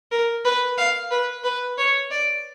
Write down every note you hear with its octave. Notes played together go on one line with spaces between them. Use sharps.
A#4
B4
F5
B4
B4
C#5
D5